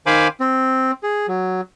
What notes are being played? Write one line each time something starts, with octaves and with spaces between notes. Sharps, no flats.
D#3 C5 F5 G#5 B5 D6
C4
G#4
F#3